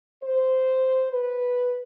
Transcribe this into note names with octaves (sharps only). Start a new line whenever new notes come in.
C5
B4